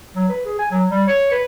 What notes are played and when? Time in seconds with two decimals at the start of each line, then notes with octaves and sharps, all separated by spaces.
0.16 F#3
0.29 B4
0.45 G#4
0.59 G#5
0.71 F#3
0.90 G3
1.07 C#5
1.31 B4